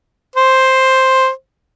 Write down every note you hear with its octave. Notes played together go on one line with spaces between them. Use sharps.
C5